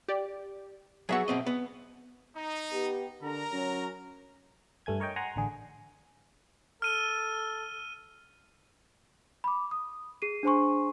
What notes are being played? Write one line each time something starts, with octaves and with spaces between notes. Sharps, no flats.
G4 D5
F#3 B3 F#4 G#4 E5 C#6
B2 C4 D#5
B3
D#4
B3 G4
D3 A#4 A#5
F#3 C#4
G2 A3 G#5 G#6
A#4 C#5 D#5 G5
F#5 G#5 A#5 C6
A1 D3 G#4
A4 F6 D#7 G7
B5 D6
D#6
G#4 C7 D#7
D4 G#4 C5 G#5 C6 C#6